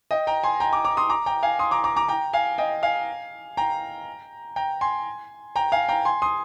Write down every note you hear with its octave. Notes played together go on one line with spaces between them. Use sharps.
D#5 G5
G5 A#5
G#5 C6
G5 A#5
A#5 D6
A#5 D6
C6 D#6
A#5 D6
G5 A#5
F5 G#5
C6 D#6
A#5 D6
A#5 D6
A#5 D6
G5 A#5
F5 G#5
D#5 G5
F5 G#5
G5 A#5
G5 A#5
G#5 C6
G5 A#5
F5 G#5
G5 A#5
G#5 C6
C6 D#6